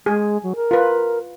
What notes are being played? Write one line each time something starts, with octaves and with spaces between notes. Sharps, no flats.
G#3 G#4
F#3
A#4
F4 B4